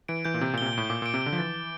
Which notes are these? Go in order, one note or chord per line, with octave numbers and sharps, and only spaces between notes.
E3 D7
E3 G6
A#2
C3 G6
A#2
C3 G7
A#2
A2 D7
A#2 D6
A#2 D7
C3
D3 G7
F3
E3 A6
G7